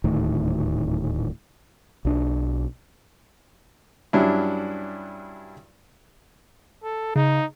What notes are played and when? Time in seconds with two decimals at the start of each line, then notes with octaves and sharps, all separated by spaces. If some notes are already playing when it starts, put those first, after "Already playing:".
0.04 D#1 D2 A2 D#3
2.05 B1 D4
4.13 G2 F#3 G3 C#4 D4 E4
6.83 A4
7.16 C#3 D#4